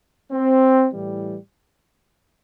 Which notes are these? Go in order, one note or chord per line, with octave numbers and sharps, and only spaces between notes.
C4
A2 E3 G3